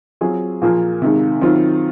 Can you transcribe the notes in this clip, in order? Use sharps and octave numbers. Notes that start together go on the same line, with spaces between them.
F#3 C4 F4 G#4
A#2 F3 A#3 F4 G#4
C3 D#3 G#3
D#3 F#3 C4 F4